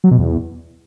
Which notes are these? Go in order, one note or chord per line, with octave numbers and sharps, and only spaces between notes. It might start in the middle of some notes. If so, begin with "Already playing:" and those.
F#3
B2
E2